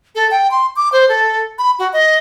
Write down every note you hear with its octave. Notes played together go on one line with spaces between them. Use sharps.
A4
G5
C6
D6
C5
A4
B5
F#4
D#5